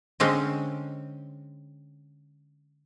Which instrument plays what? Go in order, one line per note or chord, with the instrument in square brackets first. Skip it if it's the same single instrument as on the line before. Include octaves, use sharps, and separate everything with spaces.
[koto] D3 G#3 C4 C#4